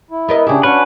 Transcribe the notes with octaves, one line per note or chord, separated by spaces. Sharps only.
E4
B3 A#4 D#5
C#3 D4 E4 G4 G#4
C#4 D4 F#4 B4